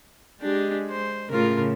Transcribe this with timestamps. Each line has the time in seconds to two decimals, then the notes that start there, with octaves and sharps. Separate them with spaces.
0.41 G#3 D4 G4
0.90 C5
1.30 A2 C#3 F4 A#4